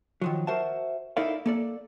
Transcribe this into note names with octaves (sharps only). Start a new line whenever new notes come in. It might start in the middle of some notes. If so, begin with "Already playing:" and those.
D#3 F3 F#3
F#4 A#4 C5 E5 F#5 A5
D#4 E4 A4 A#4 D5 F5
A#3 A4 D5